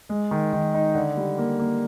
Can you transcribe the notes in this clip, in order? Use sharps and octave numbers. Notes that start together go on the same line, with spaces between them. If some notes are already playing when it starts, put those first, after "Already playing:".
G#3
D#3
D#3
D#4
D3
G3
A#3
A#3